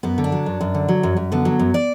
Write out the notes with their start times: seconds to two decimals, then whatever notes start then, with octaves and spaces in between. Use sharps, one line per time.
0.03 F#2 B3
0.18 D3
0.24 D4
0.32 F#3
0.46 F#2
0.61 F#2
0.74 D3
0.89 F#3
1.03 F#2
1.17 F#2
1.32 D3 B3
1.45 F#3
1.59 F#2
1.74 D5